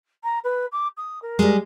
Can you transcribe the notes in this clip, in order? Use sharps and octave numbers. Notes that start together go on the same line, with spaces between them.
A#5
B4
D6
D#6
A#4
G3 G#3